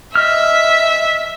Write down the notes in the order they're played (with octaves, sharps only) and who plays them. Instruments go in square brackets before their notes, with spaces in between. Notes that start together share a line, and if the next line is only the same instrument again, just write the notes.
[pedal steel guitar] D#5 F6 [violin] E5